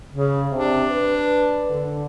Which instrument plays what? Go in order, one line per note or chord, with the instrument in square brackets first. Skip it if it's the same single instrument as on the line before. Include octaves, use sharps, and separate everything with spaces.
[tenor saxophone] C#3
[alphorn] C3 [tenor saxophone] D4
[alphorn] B4
D3